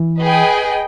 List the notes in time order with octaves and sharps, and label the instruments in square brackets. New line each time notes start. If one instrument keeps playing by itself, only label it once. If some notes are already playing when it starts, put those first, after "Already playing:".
Already playing: [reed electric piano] E3
[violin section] G#4 B4 D#5 G5